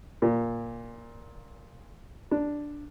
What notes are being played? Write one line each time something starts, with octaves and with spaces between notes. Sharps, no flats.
A#2
D4